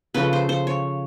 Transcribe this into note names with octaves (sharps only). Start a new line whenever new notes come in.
C#3 F3 A3 B4
C5
C5
C#5